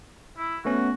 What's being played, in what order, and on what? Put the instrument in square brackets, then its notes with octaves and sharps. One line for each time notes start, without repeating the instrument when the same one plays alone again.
[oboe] E4
[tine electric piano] A3 B3 C#4 [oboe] F#4